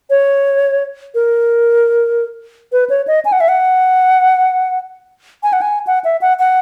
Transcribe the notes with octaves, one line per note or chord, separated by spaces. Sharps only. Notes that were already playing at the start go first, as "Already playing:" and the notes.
C#5
A#4
B4
C#5
D#5
G#5
F#5
E5
F#5
G#5
F#5
G#5
F#5
E5
F#5
F#5